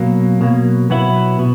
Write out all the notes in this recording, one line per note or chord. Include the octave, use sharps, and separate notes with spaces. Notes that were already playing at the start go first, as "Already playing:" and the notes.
Already playing: B2 F#3 A#3
B2 F#3 A#3
B2 F#3 B3 E4
B2